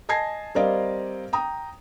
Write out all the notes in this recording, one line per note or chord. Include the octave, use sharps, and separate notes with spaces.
D#5 G#5 A5 G#6 A#6 C7
G3 C4 A#4 D5 D#5 F5
G5 A#5 D#6